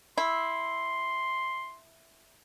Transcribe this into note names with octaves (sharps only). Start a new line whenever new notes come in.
E4 C6